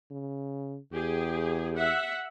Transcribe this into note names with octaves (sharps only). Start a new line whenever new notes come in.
C#3
E2 G4 G#4
E5 F#5